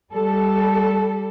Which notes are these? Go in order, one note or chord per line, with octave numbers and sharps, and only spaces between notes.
G3 A4